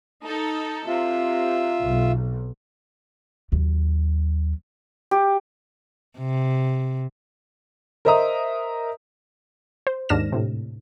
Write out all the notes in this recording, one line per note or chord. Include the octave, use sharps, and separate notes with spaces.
D#4 A4
C3 F4 E5
B1
D#2 F#3
G4
C3
A#4 C5 D#5 E5 A#5 D#6
C5
D#2 G#2 D4 F6 A#6 E7
A2 C3